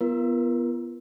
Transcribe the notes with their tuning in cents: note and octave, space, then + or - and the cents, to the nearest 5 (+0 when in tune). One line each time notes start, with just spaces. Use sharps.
B3 -5 F4 -35 A#4 +15